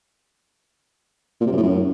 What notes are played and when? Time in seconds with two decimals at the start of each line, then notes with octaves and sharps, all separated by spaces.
1.41 A#2
1.46 C3
1.52 F#2
1.57 A2
1.63 F#2